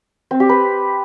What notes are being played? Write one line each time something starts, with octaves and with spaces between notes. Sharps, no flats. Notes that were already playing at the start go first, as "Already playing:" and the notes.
C4
G4
B4